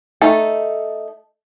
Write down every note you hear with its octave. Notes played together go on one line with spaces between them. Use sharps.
A3 D#4 A4